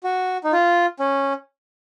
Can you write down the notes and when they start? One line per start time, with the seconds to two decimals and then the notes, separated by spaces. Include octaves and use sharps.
0.04 F#4
0.44 D#4
0.52 F4
1.00 C#4